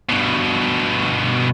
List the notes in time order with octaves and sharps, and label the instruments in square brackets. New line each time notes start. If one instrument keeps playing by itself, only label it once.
[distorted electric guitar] G2 B2